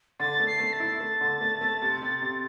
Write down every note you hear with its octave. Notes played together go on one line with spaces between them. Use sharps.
D3 A6
A3
C7
A3
A6
E4
A3
D3
A3
A3
C3
C3
C3